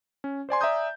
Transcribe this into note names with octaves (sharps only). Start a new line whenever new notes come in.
C#4
C5 D5 G#5 C6
D5 E5 G#5 A#5 D#6 G6